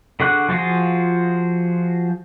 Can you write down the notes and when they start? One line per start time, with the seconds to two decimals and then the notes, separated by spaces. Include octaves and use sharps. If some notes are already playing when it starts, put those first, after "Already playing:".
0.20 D3 G#4 F#5 C#6 F#6
0.49 F3 F4 F#4 G#4